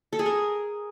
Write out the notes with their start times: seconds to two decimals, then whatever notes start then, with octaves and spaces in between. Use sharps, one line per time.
0.13 A4
0.19 G#4
0.26 A#4